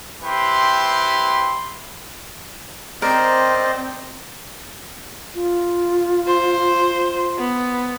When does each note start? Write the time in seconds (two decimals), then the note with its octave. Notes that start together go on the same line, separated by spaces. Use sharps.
0.22 C4 E4 G4 B4 C6
3.02 C4 A#4 C5 D5 D#5
5.35 F4
6.27 C5
7.38 B3